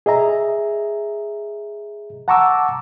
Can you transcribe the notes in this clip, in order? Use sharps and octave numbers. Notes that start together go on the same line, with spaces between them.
G#4 D#5 E5 A#5
F#5 A5 A#5 C#6 D6 E6